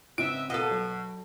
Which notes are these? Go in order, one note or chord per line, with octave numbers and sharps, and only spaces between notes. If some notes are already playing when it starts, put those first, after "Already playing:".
G#2 C#3 C4 B4 D#5 E5 D7
B2 A4 A#4 D#5 F5 F#5
F#3